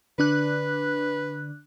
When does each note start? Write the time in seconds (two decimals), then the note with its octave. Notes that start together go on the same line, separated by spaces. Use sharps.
0.18 D3 D4 B4 F#6